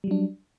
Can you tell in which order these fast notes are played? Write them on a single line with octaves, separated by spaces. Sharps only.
G3 F#3 D4